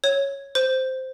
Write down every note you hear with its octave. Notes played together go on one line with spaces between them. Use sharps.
C#5
C5